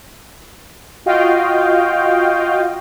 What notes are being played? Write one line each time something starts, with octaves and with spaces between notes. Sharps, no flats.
F4 F#4 D#5 F5 G5